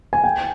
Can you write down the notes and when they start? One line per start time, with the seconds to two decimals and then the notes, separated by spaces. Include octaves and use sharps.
0.13 G#5
0.24 G5